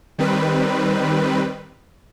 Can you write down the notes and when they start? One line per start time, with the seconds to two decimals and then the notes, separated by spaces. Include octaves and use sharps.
0.18 D#3 G3 C4 B4